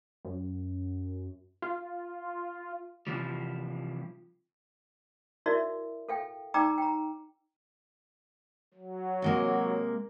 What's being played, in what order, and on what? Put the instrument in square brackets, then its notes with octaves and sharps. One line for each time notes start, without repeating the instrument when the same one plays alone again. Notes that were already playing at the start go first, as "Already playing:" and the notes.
[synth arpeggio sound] F#2
F4
[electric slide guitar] C3 E3 F3 G3
[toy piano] E4 F#4 A#4 D5 E5
A4 F5 G5
D#4 D5 G5 A#5 D6 E6
G5 A#5
[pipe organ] F#3
[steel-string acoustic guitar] C3 G#3 A#3